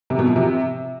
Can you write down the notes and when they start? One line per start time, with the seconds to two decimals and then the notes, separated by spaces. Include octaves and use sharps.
0.10 C3
0.19 B2
0.27 F3
0.36 C3